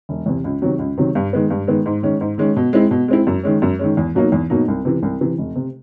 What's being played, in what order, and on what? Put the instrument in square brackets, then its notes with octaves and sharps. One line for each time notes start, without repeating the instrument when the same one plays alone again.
[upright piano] E1
E2 C3
C#2
C3 D#3 F#3
C#2
C3 D#3 F#3
G2
D#3 G#3 B3
G2
D#3 G#3 B3
G#2
D#3 G#3 C#4
G#2
D#3 G#3 C#4
B2
G#3 C4 E4
B2
G#3 C4 E4
F#2
D#3 G#3 C#4
F#2
D#3 G#3 C#4
E2
B2 F#3 A#3 D#4
E2
B2 F#3 A#3 D#4
C2
C3 E3
C2
C3 E3
F1
C3